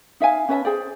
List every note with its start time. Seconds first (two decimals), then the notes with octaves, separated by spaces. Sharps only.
0.20 D#4 E5 F5 G#5
0.49 C#4 B4 E5 A5
0.65 G#4 C5 D5